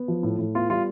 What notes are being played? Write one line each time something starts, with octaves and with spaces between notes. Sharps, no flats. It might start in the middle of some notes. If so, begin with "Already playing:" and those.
Already playing: B3
F3
A2
A2
B3 F4
G3 F4